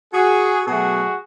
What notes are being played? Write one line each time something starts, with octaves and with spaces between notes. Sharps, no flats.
F#4 G#4
B2 F#3 A3 F#4 G#4